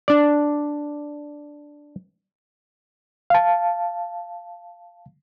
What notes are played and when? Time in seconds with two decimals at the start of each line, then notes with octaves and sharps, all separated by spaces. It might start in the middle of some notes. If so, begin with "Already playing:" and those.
0.08 D4 D5
3.30 F5 A5